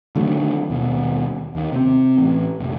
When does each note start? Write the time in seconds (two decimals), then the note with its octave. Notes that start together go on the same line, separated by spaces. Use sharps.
0.16 D3 D#3 F#3 A3
0.70 D#2 B2
1.55 D#2
1.72 C3 C4
2.18 A1
2.60 F1 A#1